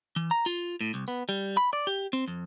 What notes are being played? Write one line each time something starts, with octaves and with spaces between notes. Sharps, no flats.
E3
A#5
F4
A2
C2
B3
G3
B5
D5
G4
C4
F2